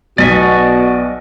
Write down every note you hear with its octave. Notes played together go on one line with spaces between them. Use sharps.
B1 B2 F#4 D5 D#5 C#6 B6